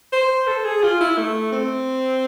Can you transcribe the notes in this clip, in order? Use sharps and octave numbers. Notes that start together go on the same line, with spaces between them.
C5
A4
G#4
F4
E4
A3
C4